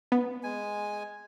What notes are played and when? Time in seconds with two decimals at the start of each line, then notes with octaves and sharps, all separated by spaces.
0.12 B3
0.43 G#3 G#5